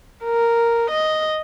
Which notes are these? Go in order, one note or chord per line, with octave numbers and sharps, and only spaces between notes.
A#4
D#5